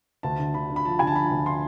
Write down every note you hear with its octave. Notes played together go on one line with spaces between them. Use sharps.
D2 A5
D3
D3 B5
D3
B5
F3 A5
D3 G#5
A5
F3 B5
D2
C6